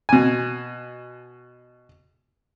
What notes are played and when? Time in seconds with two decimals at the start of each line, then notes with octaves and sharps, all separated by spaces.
0.09 B2 G#5